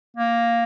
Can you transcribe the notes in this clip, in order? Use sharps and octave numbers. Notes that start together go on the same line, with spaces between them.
A#3